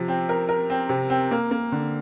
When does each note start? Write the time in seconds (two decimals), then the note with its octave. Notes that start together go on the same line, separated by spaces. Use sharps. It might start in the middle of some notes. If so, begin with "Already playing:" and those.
Already playing: C3 F3
0.08 C4
0.29 A#4
0.49 A#4
0.70 C4
0.89 C3
1.10 C4
1.31 A#3
1.51 A#3
1.72 D3